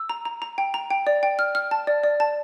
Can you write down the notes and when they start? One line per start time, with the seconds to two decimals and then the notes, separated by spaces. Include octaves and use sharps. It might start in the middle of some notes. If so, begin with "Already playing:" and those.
Already playing: E6
0.09 A#5
0.25 A#5
0.42 A#5
0.58 G5
0.74 A#5
0.91 G5
1.07 D5
1.23 G5
1.39 F6
1.55 F6
1.71 A5
1.87 D5
2.04 D5
2.20 A5